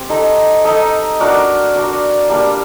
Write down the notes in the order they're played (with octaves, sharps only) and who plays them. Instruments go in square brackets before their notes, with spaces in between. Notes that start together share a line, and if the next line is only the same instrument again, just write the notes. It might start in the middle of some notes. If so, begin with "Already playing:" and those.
Already playing: [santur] C4 G4
D#4 A4 D#5
D#4 A4 D#5
D4 F#4 A#4 D5
D4 F#4 A#4 D5
G3 A#3 D4